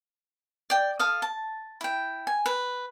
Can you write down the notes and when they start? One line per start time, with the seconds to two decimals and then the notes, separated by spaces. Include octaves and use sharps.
0.70 D5 G5
0.99 A4 F5 D#6
1.22 A5
1.81 E4 G5
2.27 G#5
2.46 B4